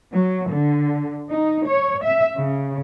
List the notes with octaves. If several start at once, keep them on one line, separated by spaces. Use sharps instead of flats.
F#3
D3
D#4
C#5
E5
C#3